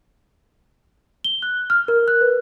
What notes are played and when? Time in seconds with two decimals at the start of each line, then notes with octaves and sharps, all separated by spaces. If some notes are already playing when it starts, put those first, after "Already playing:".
1.24 G7
1.42 F#6
1.70 F6
1.88 A#4
2.08 F#6
2.21 B4